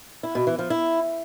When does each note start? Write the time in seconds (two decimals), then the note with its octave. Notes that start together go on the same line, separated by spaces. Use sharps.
0.23 E4
0.35 B2
0.47 E3
0.59 F3
0.70 E4